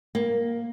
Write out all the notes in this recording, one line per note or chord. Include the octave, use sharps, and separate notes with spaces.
A#3